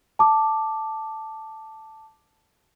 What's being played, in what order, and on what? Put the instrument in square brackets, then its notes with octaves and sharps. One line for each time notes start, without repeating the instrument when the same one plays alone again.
[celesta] A5 D6